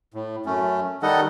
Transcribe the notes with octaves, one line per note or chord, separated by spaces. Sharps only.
A2
F#2 A3 C#4
D#3 G3 D#4 A4 D#5 F#5